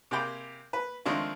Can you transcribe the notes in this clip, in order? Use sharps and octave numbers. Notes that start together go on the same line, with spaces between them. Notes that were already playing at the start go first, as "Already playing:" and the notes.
C3 A#3 G#4 D5 G5 B5
B4
D#3 F3 G#3 A3 C4 D4